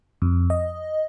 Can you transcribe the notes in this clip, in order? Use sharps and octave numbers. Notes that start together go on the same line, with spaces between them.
F2
D#5